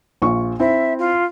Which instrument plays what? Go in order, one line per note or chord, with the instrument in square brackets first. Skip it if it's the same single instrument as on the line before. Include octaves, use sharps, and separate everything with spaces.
[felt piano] A#1 F4 C#6
[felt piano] C4 E4 [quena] E5
[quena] F4